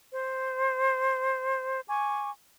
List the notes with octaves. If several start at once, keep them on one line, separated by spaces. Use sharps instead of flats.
C5
G#5 C#6 D6